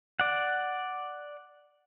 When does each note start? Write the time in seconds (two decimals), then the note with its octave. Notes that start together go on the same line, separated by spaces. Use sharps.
0.20 D5 F#5